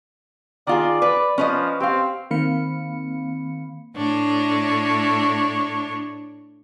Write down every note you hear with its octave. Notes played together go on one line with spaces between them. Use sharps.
D#3 F4 G#4 D5
B4 D5
F3 C#4 B4 D#5
C4 G4 F5
D#3 A#3 C4 F5 B5 C#7
A2 D4 C#5